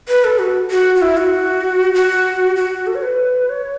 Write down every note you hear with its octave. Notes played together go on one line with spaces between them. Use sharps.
B4
A4
F#4
F#4
F#4
E4
F#4
F#4
F#4
A4
C#5
B4
C#5